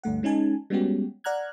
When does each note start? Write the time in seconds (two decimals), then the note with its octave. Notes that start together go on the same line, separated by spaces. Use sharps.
0.04 D2 G2 A3 F#5
0.23 G#3 C#4 D#4 G#5 A5
0.70 G3 G#3 B3 C#4 F#4 G4
1.24 D5 F#5 A#5 F6 F#6 G#6